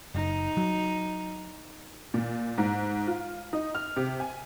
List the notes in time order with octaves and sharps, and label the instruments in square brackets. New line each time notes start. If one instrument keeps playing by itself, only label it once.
[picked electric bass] F#1 [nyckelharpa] D#4
[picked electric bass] F#3
[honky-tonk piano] A#2
G#2
F4
D#4
F6
C3
G#5